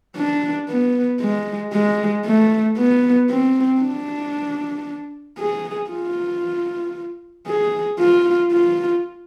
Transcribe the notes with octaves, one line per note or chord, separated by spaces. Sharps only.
D4
B3
G#3
G#3
A3
B3
C4
D4
G#4
F4
G#4
F4
F4